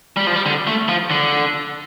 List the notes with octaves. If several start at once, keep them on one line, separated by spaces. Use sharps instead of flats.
G3
F3
G3
D3
A3
F3
D3